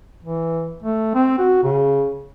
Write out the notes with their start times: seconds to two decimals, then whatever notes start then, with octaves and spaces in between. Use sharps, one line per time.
0.24 E3
0.83 A3
1.15 C4
1.39 F#4
1.64 C#3